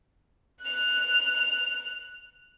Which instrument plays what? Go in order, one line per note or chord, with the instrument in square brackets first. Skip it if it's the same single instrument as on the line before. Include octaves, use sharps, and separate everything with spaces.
[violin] F#6 F7